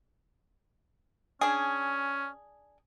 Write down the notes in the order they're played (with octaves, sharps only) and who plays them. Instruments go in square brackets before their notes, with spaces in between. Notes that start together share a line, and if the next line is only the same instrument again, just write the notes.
[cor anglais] C#4 [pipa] D4 G#4